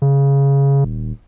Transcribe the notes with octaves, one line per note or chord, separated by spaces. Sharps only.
C#3
D#1